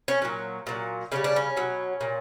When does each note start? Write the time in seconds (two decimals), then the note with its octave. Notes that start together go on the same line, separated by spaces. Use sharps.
0.08 C#4
0.22 A#2 F#3
0.67 A#2 F#3
1.12 C#3 E3 G3 C#4
1.24 D4
1.36 C#4
1.57 B2 F#3
2.01 A#2